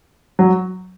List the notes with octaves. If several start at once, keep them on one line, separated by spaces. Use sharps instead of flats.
F#3